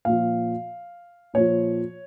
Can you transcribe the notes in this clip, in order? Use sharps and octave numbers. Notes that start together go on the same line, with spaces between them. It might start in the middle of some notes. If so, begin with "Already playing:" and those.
A#2 F3 F5
A#2 F3 C#5